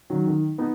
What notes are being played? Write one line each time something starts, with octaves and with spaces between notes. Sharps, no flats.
D#3 F#3
D#3
B3 D#4